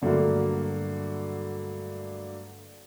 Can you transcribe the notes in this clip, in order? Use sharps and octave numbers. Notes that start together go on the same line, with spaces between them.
G2 D3 F#3 A3 A#3 F#4